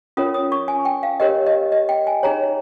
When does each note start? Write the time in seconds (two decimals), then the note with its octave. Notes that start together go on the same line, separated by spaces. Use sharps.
0.17 C#4 F4 A#4 C#5 D#6
0.34 D#6
0.52 C#6
0.68 G#5
0.85 G5
1.03 F5
1.20 G4 A#4 C#5 D#5
1.47 D#5
1.72 D#5
1.89 G5
2.07 G#5
2.23 D#4 G#4 C#5 A#5